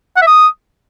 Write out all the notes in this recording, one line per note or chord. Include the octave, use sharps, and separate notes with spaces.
F#5
E5
D#6